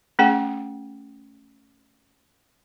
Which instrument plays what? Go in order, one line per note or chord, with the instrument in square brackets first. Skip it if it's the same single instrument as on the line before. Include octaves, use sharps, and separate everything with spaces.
[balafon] A3 C#4 G#4 F#5 G5